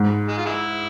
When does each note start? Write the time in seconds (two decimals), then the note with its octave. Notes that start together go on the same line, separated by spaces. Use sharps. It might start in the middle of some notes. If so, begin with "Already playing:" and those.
Already playing: G#2
0.28 G#3
0.37 F4
0.46 G#3 E4